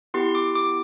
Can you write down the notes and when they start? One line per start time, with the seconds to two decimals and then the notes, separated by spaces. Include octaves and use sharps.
0.14 B3 E4 G4 C6
0.35 D6
0.55 D6